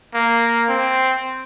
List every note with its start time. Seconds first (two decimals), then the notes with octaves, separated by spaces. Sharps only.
0.14 A#3
0.69 C4